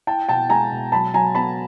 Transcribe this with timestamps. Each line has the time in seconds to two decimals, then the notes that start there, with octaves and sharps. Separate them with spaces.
0.07 E4 G5 A5
0.28 B2 G5 A5
0.50 G#3 G#5 A#5
0.72 B2
0.92 F#3 A5 B5
1.14 F#3 G#5 A#5
1.35 B3 A5 B5